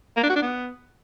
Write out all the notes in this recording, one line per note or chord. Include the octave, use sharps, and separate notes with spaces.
A#3
D4
F#4
D4
B3